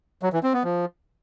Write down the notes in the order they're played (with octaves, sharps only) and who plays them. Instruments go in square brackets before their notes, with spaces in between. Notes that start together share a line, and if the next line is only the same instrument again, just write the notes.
[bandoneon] F#3
E3
C4
B3
F3